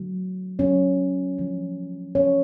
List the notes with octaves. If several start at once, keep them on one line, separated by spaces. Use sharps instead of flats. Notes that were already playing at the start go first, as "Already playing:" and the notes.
Already playing: D3 F#3 A3
D3 F#3 A3 C#4 C#5
D3 F3 A3
D3 F3 A3 C#4 C#5